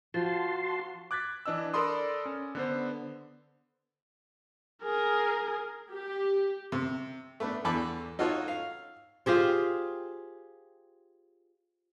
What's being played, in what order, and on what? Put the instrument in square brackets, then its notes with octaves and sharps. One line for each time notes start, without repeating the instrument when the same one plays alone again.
[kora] F3 [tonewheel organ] F#4 A5 C6
[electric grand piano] D6 F#6 G#6 A6 B6
E3 D4 D#5 E6
A4 A#4 D5 B5 C6 D#6
C#4
D3 B3 C5
[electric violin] G#4 A#4
[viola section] G4
[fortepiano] C3
A3 B3 D4
E2 E3 A4 B5 D6
D#4 F4 F#4 A4 C#5
F5
[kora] F4 G4 G#4 C5